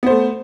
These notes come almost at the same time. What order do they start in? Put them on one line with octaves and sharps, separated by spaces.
B3 C5 A3